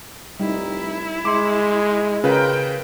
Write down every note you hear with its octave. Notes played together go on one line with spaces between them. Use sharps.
F1 G3 D#4 E4
G#3 C6 D6
C#3 F4 A#4 B4 F5 G5